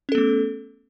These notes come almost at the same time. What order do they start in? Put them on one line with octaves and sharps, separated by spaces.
C#4 A4 B3 A3